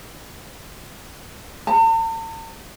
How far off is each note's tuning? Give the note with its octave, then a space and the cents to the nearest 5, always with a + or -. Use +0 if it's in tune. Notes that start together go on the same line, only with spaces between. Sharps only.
A5 +45